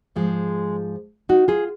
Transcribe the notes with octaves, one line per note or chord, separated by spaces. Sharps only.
G#2 F3 G#3
D#4 F#4
F4 G#4